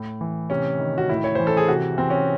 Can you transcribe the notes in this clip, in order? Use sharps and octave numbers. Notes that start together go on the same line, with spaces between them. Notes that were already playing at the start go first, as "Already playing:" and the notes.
Already playing: A2
E3
C3 C#4
D#3
F#4
A2 E4
C#5
E3 C5
A4
G#4
C3 F#4
E3 C4
C#4